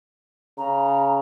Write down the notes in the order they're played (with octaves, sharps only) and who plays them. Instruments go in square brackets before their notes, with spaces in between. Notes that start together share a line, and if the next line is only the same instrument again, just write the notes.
[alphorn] C#3 [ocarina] A#5